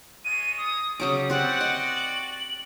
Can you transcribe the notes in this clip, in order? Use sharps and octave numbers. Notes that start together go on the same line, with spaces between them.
G#3 F4 C#5 D#7
D#6
C#3 F#3 G3 D6 D#6
C4 F#4 G4 D5 F#5
D#5
F#7